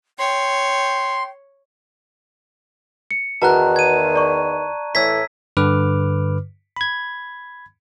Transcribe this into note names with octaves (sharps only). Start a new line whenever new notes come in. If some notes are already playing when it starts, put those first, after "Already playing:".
C#5 G5 C6
C#7
E2 D#3 F#4 B4 F#5 A5 A#5 F#6
G#6 D#7
D5 C#6
A2 E3 E6 G#6 B6
G2 D3 B4 D6 F6
B5 G#6